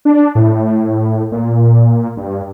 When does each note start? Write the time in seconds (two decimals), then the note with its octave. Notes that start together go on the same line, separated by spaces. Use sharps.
0.05 D4
0.35 A2
1.32 A#2
2.17 G2